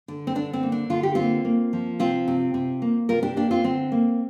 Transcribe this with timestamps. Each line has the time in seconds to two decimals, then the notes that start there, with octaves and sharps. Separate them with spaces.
0.08 D3
0.27 C4
0.35 D3 D4
0.53 C4
0.63 A#3
0.72 D4
0.90 D3 F4
1.03 G4
1.15 A#3 C4 F4
1.45 A#3
1.73 F3
1.99 C3 C4 F4
2.28 C3
2.54 C3
2.82 A#3
3.09 C3 F4 A#4
3.23 D4 G4
3.36 A#3 D4 G4
3.51 C4 F4
3.64 D3 C4
3.92 A#3